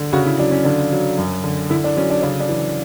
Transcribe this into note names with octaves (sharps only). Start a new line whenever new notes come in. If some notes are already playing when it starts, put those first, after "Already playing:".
Already playing: D3
C#3 F#4
E4
F#3 D4
C#4
D3 D4
F#3
F#2
D3
D3 E4
D4
F#3 C#4
D4
C#3 D4
D4
E3